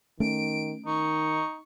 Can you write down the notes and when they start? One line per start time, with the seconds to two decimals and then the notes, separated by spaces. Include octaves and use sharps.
0.20 D#3 A3 C#4 D7
0.86 D#3 D#4 C#6